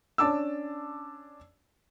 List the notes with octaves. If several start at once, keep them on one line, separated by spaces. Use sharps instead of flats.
C#4 D4 A5 D6 E6